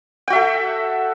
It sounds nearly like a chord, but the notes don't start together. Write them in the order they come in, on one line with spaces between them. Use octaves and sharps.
G5 F#4 E5 A4